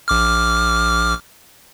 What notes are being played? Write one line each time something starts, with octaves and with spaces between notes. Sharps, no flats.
A#1 D6 F6